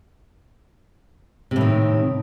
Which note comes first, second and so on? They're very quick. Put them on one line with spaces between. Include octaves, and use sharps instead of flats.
C3 A2 D#3